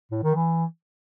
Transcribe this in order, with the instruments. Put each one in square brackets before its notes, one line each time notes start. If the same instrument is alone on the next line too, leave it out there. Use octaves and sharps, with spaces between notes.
[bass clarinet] A2
D#3
E3